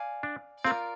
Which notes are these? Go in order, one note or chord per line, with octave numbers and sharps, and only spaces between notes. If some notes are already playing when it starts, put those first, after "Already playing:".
Already playing: D5 F5 G#5
D4
C4 F4 A#4 D5